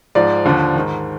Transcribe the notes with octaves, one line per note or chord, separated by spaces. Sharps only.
G#2 F3 D5
D#2 D3 F3
G#2 D#3